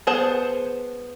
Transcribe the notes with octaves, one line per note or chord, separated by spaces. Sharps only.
B3 G#4 C5 A5